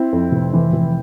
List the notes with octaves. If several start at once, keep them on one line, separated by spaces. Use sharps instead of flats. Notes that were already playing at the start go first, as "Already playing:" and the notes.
Already playing: C4 E4
F2
F1
E3
F1